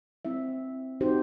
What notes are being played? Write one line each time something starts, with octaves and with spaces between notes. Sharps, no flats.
C4 E4 E5
C4 D#4 F#4 G4 C5